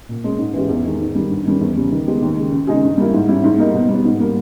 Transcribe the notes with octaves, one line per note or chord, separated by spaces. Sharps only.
A#2
G#3 C#4
G#2
E3 G#3 C#4 G4
E2
D#3 G#3
G#2
D#3 G3
G2
D#3 G3 C#4
E2
C#3 G3
D#3
G#3 B3 G4
D#2
C#3 G#3
C#2
C#3 G#3 D#4 G#4
G2
G3 A#3 E4
G#2
G3 C#4 E4
G#2
G3 A#3 D#4
B2
G3
B3
G#2
G3 A#3